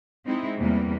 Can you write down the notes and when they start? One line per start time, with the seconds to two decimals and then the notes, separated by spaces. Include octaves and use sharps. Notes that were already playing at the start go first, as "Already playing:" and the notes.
0.25 G#3 C4 D#4 E4
0.59 E2 C3 E3 G3 A#3